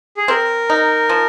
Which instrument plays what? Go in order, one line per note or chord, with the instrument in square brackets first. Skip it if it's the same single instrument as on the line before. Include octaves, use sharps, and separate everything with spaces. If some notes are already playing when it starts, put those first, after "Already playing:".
[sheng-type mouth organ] G#4
[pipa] C4 [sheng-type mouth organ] A#4
[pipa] D#4
F3